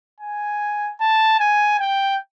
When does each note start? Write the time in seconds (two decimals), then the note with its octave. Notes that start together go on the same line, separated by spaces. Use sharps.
0.20 G#5
1.01 A5
1.40 G#5
1.80 G5